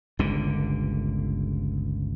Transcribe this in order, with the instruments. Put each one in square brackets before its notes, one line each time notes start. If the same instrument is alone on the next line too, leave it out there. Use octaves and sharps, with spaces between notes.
[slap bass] G1 C#2 A#2 D3